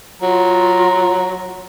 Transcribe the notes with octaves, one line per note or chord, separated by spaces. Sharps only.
F#3 F4 A#5